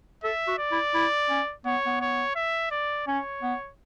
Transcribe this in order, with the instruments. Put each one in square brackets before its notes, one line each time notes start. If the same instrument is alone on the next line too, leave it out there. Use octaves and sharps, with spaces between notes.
[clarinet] A4 [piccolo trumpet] E5
[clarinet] F#4
[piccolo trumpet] D5
[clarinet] E4
E4
C#4
[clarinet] B3 [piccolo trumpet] C#5
[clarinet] B3
[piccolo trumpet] C#5
E5
D5
[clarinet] C#4 [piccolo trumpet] C#5
[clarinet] B3